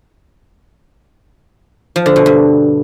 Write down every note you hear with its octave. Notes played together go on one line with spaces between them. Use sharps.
F3
D3
B2
G2